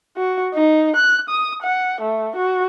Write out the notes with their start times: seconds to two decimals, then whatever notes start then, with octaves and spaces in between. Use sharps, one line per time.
0.17 F#4
0.54 D#4
0.96 F#6
1.29 D#6
1.63 F#5
2.01 A3
2.36 F#4